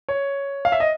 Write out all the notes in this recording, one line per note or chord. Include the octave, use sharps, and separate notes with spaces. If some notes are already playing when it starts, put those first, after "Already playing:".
C#5
F5
E5
D#5